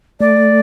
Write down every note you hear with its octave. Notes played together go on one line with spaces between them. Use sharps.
A3 D5